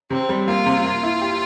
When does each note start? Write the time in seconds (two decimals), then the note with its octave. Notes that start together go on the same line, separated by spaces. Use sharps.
0.10 C3 C4
0.29 G3
0.48 A#3 F4
0.66 C3
0.84 A#3
1.03 E4
1.21 G4